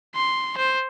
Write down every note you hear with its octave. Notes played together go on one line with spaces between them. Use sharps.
C6
C5